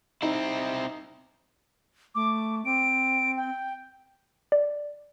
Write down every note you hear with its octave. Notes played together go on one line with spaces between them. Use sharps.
C4 D#4 E4
A3 D6
C4 D7
G5
D5